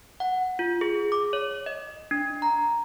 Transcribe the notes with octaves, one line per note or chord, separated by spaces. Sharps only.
F#5
F4
G#4
D6
C#5
D#5
D4
A#5